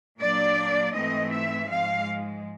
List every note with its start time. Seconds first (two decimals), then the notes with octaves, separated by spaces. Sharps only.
0.20 A#2 F#3 A#3 D4 D5
0.94 G#2 E3 A3 C4 D#5
1.31 E5
1.68 G#2 F3 G#3 F5